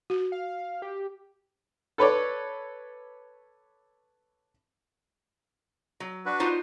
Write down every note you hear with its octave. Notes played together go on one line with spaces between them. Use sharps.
F#4
F5
G4
A4 B4 C#5 D5
F#3
D4 F#4 B4
D#4 F4 C5